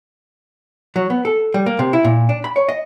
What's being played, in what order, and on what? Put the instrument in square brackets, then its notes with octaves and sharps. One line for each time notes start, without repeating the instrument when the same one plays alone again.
[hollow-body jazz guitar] F#3
B3
A4
G3
A#3
C3
E4
A#2
D4
B5
C#5
D#5